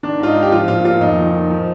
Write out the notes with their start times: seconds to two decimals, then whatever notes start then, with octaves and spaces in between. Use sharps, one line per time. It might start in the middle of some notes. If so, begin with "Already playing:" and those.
0.03 D#3 D4
0.20 G#2 F4
0.27 D#4
0.35 G#2
0.43 G4
0.52 F3 F4
0.68 A#2 F4
0.84 A#2 F4
1.01 F2 D#4
1.17 D#3
1.35 D#3
1.50 F3